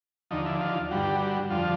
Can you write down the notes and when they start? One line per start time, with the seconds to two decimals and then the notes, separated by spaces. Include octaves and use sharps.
0.31 D#2 D3 F3 D#4
0.46 E4
0.61 F4
0.91 G2 D3 G3 F#4
1.03 G4
1.16 F#4
1.50 F2 D3 F3 F4